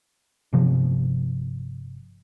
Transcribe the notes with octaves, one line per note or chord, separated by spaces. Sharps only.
G1 C3 F3